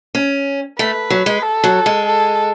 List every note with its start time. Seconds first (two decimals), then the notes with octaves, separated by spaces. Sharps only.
0.15 C#4
0.79 A3 B4
1.10 F#3
1.26 G#3
1.43 A4
1.64 F#3
1.86 G#3
2.06 A4